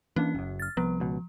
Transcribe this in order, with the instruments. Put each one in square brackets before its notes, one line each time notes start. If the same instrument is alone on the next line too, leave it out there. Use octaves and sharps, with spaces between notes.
[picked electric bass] E3 A#3 D4 [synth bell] C#4
[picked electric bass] F#1 F#2
[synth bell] F6 A6
[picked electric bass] C2 B3 [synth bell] F3
[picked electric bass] C#2 B2